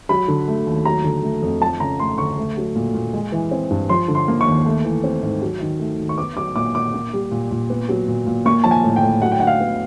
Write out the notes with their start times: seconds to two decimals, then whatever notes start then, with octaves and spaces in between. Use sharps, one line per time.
0.09 F#3 B5
0.28 D3
0.48 A3
0.67 D#2
0.85 F#3 A#5
1.04 D3
1.23 A3
1.42 F2
1.61 F3 A5
1.80 C#3 A#5
1.99 A3 C6
2.18 D2 C#6
2.38 A3
2.57 F#3
2.75 A#2
2.94 A#2
3.13 G#3
3.32 E3
3.51 C4
3.70 G2
3.89 F3 C6
4.08 D3
4.15 C6
4.28 A#3
4.41 C#6
4.47 D#2
4.66 A3
4.85 E3
5.04 C4
5.23 G#2
5.42 F#3
5.61 D#3
5.79 A3
5.99 D#2
6.09 C#6
6.18 B3 D6
6.37 F#3 D6
6.56 A#2 D6
6.75 A#2 D6
6.94 A#3
7.13 G3
7.32 A#2
7.51 A#2
7.70 B3
7.89 F#3
8.08 A#2
8.27 A#2
8.45 A#3 C#6
8.64 F3 A5
8.71 G#5
8.84 A2
8.96 G5
9.03 A2
9.22 F#3 F#5
9.32 G5
9.40 D3 F#5
9.47 F5
9.60 B3